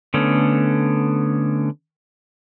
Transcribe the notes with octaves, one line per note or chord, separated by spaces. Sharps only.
D3 A3 B3 C#4